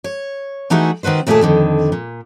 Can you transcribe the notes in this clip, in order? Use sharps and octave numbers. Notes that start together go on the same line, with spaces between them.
C#5
E3 A3 D#4 E4 F#4 G#4
D#3 C4 F#4 B4 C5
D#2 A#2 A3 C4 G#4 A4
F2 D3 D#3
A#2